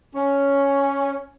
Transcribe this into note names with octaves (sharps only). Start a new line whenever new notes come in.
C#4